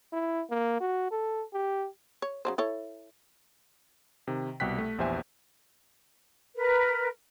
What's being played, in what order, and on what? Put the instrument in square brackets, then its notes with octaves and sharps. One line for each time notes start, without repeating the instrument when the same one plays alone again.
[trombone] E4
A#3
F#4
A4
G4
[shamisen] C#5
C#3 F#3 C5
E4 A4 C#5
[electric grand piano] C3 D#3
C2 B2 G5 F#6 B6
A3
A#1 E2 G4 C5 E5 G#5
[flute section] A#4 B4